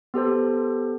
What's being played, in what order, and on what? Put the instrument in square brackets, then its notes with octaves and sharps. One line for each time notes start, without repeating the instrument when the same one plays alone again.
[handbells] B3 G4 A4 C5